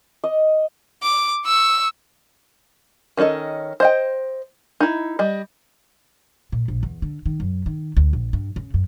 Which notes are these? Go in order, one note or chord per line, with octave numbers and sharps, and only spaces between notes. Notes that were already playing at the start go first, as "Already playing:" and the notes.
D#5
D6
C#6 E6
D#3 C#4 D4 A4 D#5
C5 D#5 G5
D#4 E4
G3 D#5
A#2
A#1
E2
D3
D#3
F#2
D#3
D2
A#1
G2
C#3
F#2